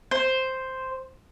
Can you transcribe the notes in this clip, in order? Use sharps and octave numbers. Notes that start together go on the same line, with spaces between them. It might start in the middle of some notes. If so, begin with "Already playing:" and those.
C5